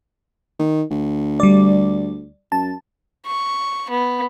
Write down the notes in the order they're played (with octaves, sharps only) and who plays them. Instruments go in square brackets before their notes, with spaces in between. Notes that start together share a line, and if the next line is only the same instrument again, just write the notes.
[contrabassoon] D#3
D2
[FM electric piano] G3 D5
[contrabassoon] F#2 [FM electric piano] A5
[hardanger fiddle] C#6
B3